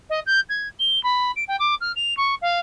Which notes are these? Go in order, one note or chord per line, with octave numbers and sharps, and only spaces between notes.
D#5
G6
G#6
G7
B5
D7
G5
D6
F6
F7
C#6
F5